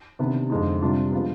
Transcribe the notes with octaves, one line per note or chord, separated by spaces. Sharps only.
C3 D#3 B3 D4
F2 D3 G#3 C4 D#4
C3 G3 D4 F4
D3 F3 G#3 B3